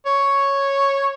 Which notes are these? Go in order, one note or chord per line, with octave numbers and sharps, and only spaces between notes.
C#5